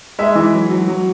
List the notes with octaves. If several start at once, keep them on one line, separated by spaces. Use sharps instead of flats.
G#3 E5
E3
F#3
F#3
F#3